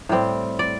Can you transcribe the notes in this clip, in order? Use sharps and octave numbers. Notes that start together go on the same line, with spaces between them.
A2 G3 C4
D5